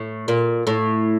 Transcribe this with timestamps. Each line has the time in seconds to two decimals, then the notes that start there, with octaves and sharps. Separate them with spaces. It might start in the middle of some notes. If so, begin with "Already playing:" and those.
Already playing: A2
0.28 A#2
0.67 A2